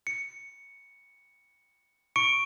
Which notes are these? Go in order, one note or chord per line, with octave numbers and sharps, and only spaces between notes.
C#7
C#6 C#7 D7